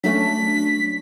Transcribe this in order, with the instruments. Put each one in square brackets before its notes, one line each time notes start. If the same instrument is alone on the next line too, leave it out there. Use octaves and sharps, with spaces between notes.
[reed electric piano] F#3 A3 C#4 [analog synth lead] D4 [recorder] B6